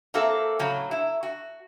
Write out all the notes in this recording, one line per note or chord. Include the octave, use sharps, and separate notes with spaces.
A#3 C4 E4 F#4 A4
A2 C#3 F#3
E4
F#4